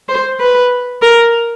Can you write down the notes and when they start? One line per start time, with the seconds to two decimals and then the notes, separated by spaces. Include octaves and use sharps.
0.09 C5
0.40 B4
1.02 A#4